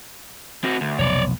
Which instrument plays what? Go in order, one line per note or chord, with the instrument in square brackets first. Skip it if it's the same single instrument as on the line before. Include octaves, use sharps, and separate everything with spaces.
[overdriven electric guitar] C4 F#4
D2
[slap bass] F1 B1 [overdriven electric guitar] C#5 D5